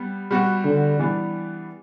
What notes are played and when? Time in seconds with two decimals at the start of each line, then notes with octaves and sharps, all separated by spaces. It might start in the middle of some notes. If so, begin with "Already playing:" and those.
Already playing: G3 B3
0.31 G3 B3 F#4
0.65 D3
0.99 E3 G3 B3 D4